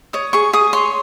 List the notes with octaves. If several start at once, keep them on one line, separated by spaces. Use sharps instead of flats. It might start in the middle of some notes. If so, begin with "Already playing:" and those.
C#5 D#6
G#4 C#6
G#4 D#6
C#5 C6